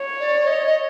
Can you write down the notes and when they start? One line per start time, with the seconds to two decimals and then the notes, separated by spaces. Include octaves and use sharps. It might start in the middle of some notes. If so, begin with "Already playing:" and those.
Already playing: C#5
0.20 D5
0.47 D#5
0.66 D#5